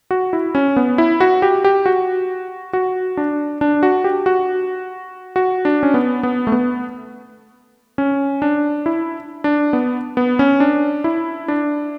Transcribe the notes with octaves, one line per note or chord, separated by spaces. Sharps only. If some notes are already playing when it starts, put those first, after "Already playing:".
F#4
E4
C#4
B3
E4
F#4
G4
G4
F#4
F#4
D4
D4
F#4
G4
F#4
F#4
D4
C#4
B3
B3
A3
B3
C#4
D4
E4
D4
B3
B3
C#4
D4
E4
D4